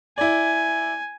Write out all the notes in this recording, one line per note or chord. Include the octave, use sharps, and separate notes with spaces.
E4 D5 G#5